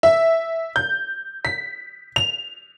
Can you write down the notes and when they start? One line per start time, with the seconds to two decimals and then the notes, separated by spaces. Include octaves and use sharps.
0.03 E5
0.76 G6
1.45 B6
2.16 F7